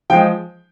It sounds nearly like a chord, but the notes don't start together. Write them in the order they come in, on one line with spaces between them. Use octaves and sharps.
F3 G5 G#3